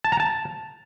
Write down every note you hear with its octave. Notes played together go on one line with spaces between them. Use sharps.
A5
A#5
A5